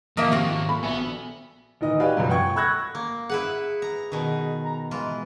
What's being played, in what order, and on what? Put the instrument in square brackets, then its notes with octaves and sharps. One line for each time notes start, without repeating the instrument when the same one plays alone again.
[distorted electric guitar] D#2 G#2 [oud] F3 A#3 E5 [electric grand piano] D#6 A#6 D7
[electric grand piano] C3 [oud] F4 F#4
[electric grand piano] A4 B5
[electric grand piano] A#1 E5 G#5 [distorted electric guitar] B3
[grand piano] D1 D#3 D#4 D#5
F#4 G4 B4 D5 F5 G#5
C#2 F#2
F#5 G5 C#6 G#6
B5 C#6 E6 F#6 G#6 A#6
[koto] A#3
[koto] E4 B4 F#5 [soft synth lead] G#4
[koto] A#5
B2 D#3
[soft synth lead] A#5
[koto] E3 F4 [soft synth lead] G#3